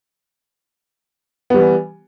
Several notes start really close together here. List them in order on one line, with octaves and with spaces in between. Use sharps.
B3 G3 E3